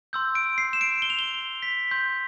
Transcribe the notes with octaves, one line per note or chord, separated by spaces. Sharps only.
C6 E6 G6
D7
C7
E7
D7
G7
F7
G7
B6
C6 G6